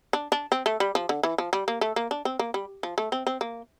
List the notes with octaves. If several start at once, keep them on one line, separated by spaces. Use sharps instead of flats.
D4
D4
C4
A3
G3
F3
D3
E3
F3
G3
A#3
A3
A#3
D4
C4
A#3
G3
F3
A3
C4
C4
A#3